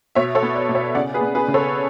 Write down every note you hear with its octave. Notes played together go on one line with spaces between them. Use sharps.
B2 C#5 E5
A4 C#5
B3
B4 D5
B2
C#5 E5
C#3 D5 F#5
G#4 B4
B3
G#4 B4
C#3
A4 C#5